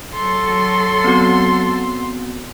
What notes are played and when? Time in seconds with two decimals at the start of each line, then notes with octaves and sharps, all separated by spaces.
0.14 F#3 A4 C6
1.04 B3 C4 F#4